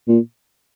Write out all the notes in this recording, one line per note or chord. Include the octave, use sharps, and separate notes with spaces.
A#2